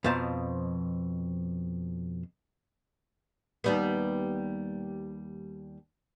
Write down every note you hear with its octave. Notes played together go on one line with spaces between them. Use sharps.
F2 B2 F3 C5 A5 A#5
D#2 G3 B3